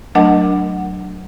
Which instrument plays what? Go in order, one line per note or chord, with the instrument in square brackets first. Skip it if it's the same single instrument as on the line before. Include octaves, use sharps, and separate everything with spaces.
[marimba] F#3 A3 D4 A#4 D#5 F#5